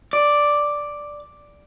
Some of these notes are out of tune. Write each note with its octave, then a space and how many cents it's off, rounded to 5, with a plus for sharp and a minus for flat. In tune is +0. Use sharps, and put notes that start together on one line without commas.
D5 +0